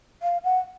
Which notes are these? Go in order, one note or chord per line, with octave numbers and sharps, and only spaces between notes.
F5
F#5